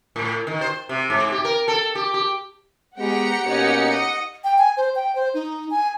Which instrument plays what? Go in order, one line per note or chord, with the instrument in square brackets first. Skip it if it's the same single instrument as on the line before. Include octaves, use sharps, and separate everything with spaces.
[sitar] A2
D#3
C5
C3
G#2
G4
A#4
A4
G4
G4
[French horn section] G#3 B3 [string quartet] G4 G5 A#5 [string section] F#5 C#7
[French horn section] B2 A#3 C#4 [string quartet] D#4 G4 C#5
[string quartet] D#5
[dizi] G5
G#5
C5
G5
C5
D#4
G#5